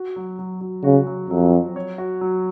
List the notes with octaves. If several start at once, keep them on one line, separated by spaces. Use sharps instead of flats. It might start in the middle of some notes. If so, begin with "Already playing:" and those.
Already playing: F#4
F#3
F#3
F#3
C#3 F#4
F#3
F2 F#3
F#3
C#5
F#4
F#3